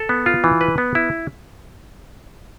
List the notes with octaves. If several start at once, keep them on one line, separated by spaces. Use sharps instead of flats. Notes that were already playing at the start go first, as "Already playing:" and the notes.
Already playing: A4
B3
F4
E3
B4
B3
E4